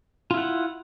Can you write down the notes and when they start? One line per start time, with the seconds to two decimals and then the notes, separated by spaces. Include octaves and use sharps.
0.31 F4
0.34 E4
0.37 F#5